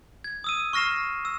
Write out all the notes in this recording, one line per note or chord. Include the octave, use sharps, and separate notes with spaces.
G#6
D#6 E6 D#7
C#6 F6 A#6 C7 E7
E6